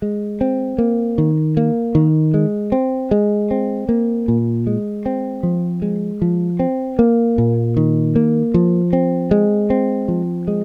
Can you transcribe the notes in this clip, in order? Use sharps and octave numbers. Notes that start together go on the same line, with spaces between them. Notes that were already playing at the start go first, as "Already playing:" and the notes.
G#3
C4
A#3
D#3
A#3
D#3
G#3
C4
G#3
C4
A#3
A#2
G#3
C4
F3
G#3
F3
C4
A#3
A#2
D#3
A#3
F3
C4
G#3
C4
F3
G#3